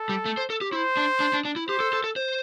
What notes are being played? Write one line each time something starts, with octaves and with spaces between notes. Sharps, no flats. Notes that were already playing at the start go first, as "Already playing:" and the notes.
Already playing: A4
G3
A3
C5
A4
G4
E4 C5
D4
D4
D4
D4
E4
G4 C5
A4
A4
A4
C5